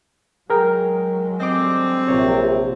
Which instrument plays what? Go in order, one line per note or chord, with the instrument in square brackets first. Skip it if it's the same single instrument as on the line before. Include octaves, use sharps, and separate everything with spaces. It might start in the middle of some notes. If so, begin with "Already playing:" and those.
[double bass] F#3 G#3 [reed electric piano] G#4 A#4 G5
[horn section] D3 G3 C4 [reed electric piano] D#5 D6
[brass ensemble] A#1 C3 [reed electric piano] C#5